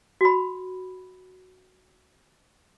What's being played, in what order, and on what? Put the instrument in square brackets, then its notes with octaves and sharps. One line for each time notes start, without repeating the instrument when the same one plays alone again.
[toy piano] F#4 B5